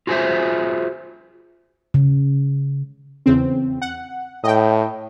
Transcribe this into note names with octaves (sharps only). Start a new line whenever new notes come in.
F4 F#4 G#4 B4 C5 E5
C#3
E2 C#3 C4
F#5
A2 D#5 G5